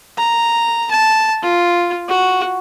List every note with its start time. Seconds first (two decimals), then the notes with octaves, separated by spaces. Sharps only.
0.18 A#5
0.91 A5
1.43 F4
2.09 F#4